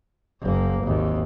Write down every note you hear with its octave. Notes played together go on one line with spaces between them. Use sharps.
F#1 A#3
G#1 D#2